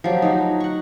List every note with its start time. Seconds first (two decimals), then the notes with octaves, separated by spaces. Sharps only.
0.04 F3 F#3 G4
0.22 D#4 F#4
0.60 F#5 C#6